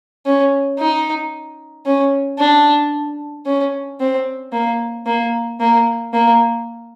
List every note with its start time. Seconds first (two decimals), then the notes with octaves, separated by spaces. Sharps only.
0.26 C#4
0.79 D#4
1.86 C#4
2.39 D4
3.46 C#4
4.00 C4
4.53 A#3
5.07 A#3
5.60 A#3
6.13 A#3